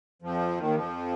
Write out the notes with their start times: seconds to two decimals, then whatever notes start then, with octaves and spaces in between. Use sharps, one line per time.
0.22 F2 F3
0.57 D#2 D#3
0.74 F2 F3